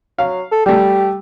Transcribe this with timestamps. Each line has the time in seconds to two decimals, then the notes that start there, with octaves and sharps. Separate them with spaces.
0.18 F#3 F5
0.51 A4
0.66 G3 A3 G4